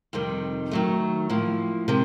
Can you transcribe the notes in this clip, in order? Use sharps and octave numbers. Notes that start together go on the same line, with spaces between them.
F2 C3 D#3 G3
D#3 F#3 A3
A2 F3 A#3
C3 D#3 G#3